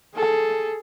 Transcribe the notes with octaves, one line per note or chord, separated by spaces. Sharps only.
G#4 A4